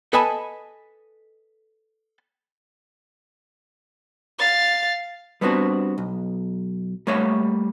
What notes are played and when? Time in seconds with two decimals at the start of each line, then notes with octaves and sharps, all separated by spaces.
0.13 A4 B4 D#5 G#5 A5 B5
4.39 F5 A6
5.41 G3 B3 C4 D4 F4 F#4
5.98 B1
7.07 G3 A3 A#3 C#5 E5 F#5